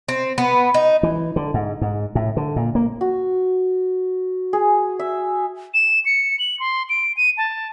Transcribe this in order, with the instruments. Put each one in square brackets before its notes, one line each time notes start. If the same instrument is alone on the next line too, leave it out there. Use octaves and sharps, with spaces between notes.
[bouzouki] C4
B3
D#4
[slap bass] E3
D3
G#2
G#2
A2
D3
A#2
A#3
[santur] F#4
G#4
E5
[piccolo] E7
C#7
F#7
C6
D7
D#7
A5